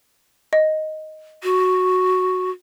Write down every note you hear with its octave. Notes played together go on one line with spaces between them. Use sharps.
D#5
F#4